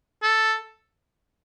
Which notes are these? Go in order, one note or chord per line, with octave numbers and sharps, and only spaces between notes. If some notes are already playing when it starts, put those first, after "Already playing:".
A4